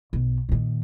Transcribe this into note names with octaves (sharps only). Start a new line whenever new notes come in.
B1
A#2 D#3